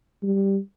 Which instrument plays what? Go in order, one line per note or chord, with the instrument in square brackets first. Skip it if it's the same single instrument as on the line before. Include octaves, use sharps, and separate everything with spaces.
[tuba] G3